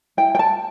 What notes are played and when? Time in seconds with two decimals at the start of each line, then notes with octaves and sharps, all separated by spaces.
0.17 E4 G5
0.35 G5
0.39 A5